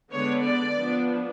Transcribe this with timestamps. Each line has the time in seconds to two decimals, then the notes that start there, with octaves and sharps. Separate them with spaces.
0.12 D3 G#3 B3 D4 C#5
0.45 D5
0.77 F3 B3 D4